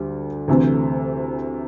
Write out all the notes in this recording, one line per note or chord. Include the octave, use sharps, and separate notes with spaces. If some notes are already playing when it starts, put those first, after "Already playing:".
Already playing: D2 D3 G3
D2 C3 E3 A3 C4